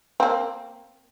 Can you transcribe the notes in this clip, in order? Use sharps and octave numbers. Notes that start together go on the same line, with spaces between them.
A#3 C4